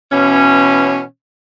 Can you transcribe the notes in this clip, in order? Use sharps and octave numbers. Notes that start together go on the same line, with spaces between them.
B2 E3 C#4